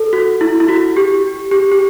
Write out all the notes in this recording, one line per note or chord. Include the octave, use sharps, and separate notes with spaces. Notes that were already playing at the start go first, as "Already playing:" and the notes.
Already playing: A4
F#4
E4
E4
F#4
G4
G4
G4